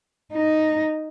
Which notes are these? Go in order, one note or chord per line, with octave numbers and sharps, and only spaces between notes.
D#4